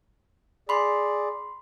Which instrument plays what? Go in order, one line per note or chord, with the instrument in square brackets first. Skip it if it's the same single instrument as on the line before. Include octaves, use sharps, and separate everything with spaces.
[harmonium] G#4 D5 [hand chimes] B5 C6